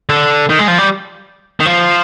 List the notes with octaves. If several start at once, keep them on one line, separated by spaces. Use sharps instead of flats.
D3
D#3
G#3
F3
G3
D#3
F3